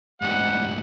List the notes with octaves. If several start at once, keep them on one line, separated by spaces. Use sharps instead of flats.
D2 G#2 G3 F#5